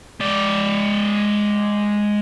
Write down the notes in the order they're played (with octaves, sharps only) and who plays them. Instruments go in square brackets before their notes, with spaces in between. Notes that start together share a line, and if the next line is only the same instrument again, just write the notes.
[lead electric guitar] G#3 D5